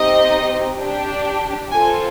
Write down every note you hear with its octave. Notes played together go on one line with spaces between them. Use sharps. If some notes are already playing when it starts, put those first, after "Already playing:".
Already playing: C4 D#4 G4 D#5
D4 G4
C4 F4 A4 G#5